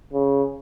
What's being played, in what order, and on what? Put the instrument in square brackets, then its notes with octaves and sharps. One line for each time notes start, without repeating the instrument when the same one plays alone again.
[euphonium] C#3